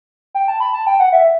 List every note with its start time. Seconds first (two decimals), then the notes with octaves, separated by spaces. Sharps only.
0.35 G5
0.48 A5
0.60 B5
0.73 A5
0.87 G5
1.00 F#5
1.13 E5